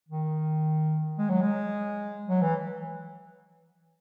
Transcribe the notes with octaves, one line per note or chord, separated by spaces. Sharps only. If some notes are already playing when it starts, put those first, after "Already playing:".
D#3
G#3
F#3
G#3
F#3
E3